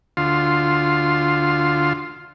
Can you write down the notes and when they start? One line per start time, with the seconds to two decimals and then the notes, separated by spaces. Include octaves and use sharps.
0.17 D2 F4 C6